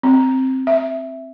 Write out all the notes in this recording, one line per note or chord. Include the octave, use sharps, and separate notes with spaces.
C4
E5